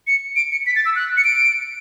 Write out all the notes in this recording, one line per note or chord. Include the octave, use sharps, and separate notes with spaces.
C#7
D7
C#7
B6
A6
E6
F#6
C#7
D7